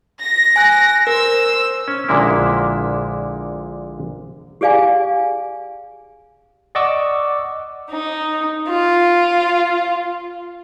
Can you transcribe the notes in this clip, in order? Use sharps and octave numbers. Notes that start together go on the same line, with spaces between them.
A#6
G#5 F#6
A#4 C5 E6
C#4
A#1 A#2 D3 G#3 A#3 E4
G4 G#4 D5 F5 G#5
D5 D#5 F#5 C#6 D6 E6
D#4
F4